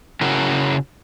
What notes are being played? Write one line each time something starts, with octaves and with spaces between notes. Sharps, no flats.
C#3 E4 F#4 A#4